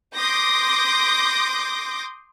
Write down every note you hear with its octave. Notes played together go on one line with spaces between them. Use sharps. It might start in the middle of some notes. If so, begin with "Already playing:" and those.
C6 D6 D#6 G6 A#6